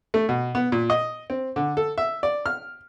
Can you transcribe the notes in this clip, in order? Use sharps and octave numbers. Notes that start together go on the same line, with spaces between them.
A3
B2
B3
A#2
D#5
C4
D3
A4
E5
D5
F6